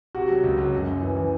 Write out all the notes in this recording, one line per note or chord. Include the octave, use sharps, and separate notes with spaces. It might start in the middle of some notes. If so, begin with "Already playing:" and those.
C3 F#4
F#3
C#2
F#3
F#2
F#2
E3
E3